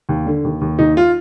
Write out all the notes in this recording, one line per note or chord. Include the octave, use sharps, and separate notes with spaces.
D#2
D3
D#2
D#2
D#2 D#4
F4